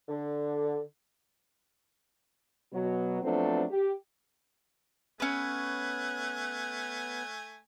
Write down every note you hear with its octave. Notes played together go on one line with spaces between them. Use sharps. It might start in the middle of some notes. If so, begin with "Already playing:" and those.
D3
B2 F#3
F3 F#3 A3 B3 C4 D4
G4
A3 B3 C#4 B4 G#5 F#6